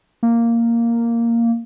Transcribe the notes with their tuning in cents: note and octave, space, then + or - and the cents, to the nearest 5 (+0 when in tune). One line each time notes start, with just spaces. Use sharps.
A#3 -5